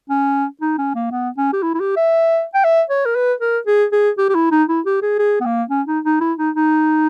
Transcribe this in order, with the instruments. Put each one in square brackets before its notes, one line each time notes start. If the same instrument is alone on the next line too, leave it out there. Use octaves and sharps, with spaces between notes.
[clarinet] C#4
D#4
C#4
A#3
B3
C#4
G4
E4
E4
G4
E5
G5
E5
C#5
A#4
B4
A#4
G#4
G#4
G4
G4
E4
D#4
E4
G4
G#4
G#4
B3
A#3
C#4
D#4
D#4
E4
D#4
D#4